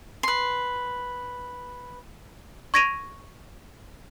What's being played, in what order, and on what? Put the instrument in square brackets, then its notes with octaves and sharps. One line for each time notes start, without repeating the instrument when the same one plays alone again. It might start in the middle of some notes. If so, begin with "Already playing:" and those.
[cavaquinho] B4 C6
[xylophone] C#6 G#6 A#6 D7 D#7 F7